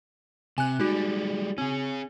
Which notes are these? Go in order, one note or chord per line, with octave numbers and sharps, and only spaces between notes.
C3 G#5 F#6
G3 G#3 D#4 F#4
C4 C#4 G#4